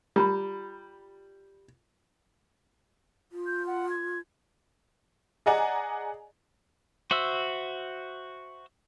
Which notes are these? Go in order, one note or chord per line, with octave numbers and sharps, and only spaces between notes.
G3 F4 A#5 B5
F4
G6
F#5
G#6
G#4 D5 D#5 F#5 G#5 A#5
F#4 C5 E5 E6